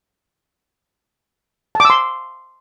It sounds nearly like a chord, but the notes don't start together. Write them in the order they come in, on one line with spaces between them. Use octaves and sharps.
A5 D6 E6 C6